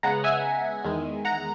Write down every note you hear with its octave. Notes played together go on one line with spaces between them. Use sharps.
C#3 G#3 B3 F#5 A#5
E5 G#5
E2 D#3 G#3
F#5 A#5